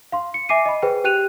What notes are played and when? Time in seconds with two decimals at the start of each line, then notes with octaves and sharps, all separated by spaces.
0.12 F5 C6
0.34 C#7
0.49 E5 G#5 D6 C7 D#7
0.65 D#5 B5
0.82 G#4 B4 C5 G5
1.04 G4 G5 F#6 D#7 F7